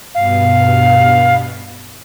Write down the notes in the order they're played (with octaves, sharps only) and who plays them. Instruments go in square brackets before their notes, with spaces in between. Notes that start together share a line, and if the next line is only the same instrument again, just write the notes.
[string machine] G2 B2 B3 [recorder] F5